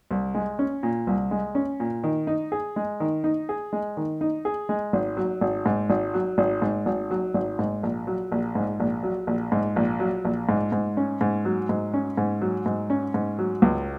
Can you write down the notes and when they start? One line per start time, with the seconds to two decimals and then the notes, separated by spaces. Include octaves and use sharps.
0.11 C2
0.34 G#3
0.59 C#4
0.83 A#2
1.07 C2
1.31 G#3
1.55 C#4
1.80 A#2
2.04 D#3
2.27 D#4
2.52 G#4
2.76 G#3
3.00 D#3
3.24 D#4
3.49 G#4
3.73 G#3
3.97 D#3
4.21 D#4
4.45 G#4
4.69 G#3
4.93 G#1
5.17 F#3
5.41 G#1
5.66 G#2
5.90 G#1
6.14 F#3
6.38 G#1
6.62 G#2
6.86 G#1
7.11 F#3
7.34 G#1
7.59 G#2
7.83 A#1
8.07 F#3
8.32 A#1
8.55 G#2
8.80 A#1
9.03 F#3
9.27 A#1
9.52 G#2
9.76 A#1
10.00 F#3
10.25 A#1
10.49 G#2
10.72 G#2
10.97 C#4
11.21 G#2
11.45 F#3
11.69 G#2
11.94 C#4
12.17 G#2
12.42 F#3
12.66 G#2
12.90 C#4
13.14 G#2
13.39 F#3
13.62 C#2